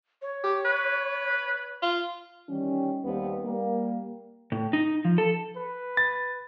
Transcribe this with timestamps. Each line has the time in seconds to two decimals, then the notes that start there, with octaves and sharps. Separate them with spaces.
0.22 C#5
0.44 G4
0.65 B4
1.82 F4
2.49 D#3 E3 G3 C#4
3.04 D#2 D#3 G3 B3 C4
3.44 G3 A#3
4.52 A2
4.73 D#4
5.05 F3
5.18 A4
5.57 B4
5.97 A6